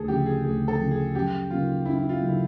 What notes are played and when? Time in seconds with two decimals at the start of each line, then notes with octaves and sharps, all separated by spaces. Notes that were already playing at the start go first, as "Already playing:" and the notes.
Already playing: D2 G#4 A4
0.08 C#3 F3 G4
0.26 G#4
0.44 D2 G#4
0.68 A4
0.80 C#3 F3
0.91 G#4
1.15 F#2 G4
1.50 C#3 F#3 A#3 D#4 F4
1.85 F#2 E4
1.99 E4
2.09 F4
2.21 C#3 F#3 A#3 D#4
2.28 E4